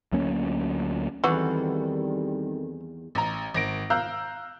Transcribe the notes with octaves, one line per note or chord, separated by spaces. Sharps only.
D2 F#3 A#3 C#4
E2 D#3 E3 G3 C4 F#4 A4
A1 A#5
G#1 A#6 D7
F5 A#5 E6 F#6 G6